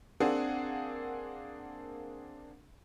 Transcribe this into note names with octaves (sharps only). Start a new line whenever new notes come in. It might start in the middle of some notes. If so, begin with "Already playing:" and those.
A#3 C4 D4 G#4 F#5